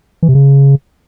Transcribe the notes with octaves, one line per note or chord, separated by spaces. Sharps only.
E3
C3
C#3